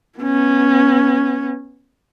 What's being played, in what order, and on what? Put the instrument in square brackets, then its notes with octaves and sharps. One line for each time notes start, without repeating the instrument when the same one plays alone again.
[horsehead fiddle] B3 C#4